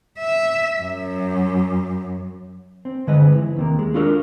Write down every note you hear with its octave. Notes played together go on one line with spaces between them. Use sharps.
E5
F#2
C4
G2 D3 G#3 B4 C5 D#5
E3
D#2 C3 A#3
G#3
D4 F4 F#4 A4 A#4 D5